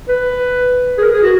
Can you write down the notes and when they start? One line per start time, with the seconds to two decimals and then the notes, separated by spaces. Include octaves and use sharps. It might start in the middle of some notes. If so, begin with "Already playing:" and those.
0.08 B4
0.98 G#4
1.01 A#4
1.13 G#4
1.23 F#4